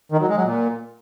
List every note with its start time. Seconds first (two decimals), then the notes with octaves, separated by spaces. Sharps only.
0.12 D#3
0.20 F#3
0.28 G#3
0.36 F#3
0.44 A#2